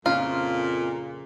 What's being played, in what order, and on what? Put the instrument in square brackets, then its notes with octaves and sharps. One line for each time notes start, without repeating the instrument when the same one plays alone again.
[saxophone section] F2 A#2 [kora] C#3 [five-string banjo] F4